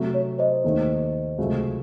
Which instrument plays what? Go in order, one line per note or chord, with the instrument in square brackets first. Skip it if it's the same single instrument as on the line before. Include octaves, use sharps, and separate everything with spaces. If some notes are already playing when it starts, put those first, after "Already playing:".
Already playing: [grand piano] C3 F#3 A3
[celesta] C#5
C5 D#5
[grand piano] D#2 D#3 A3 D#4
C#2 C3 F#3 A3